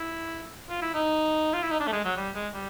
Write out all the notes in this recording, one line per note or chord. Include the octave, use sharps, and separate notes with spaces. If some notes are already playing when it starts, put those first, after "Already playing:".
Already playing: E4
F4
E4
D#4
F4
E4
D#4
D4
A3
G#3
F#3
G3
G#3
G3